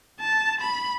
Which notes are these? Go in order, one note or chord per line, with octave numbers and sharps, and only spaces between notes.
A5
B5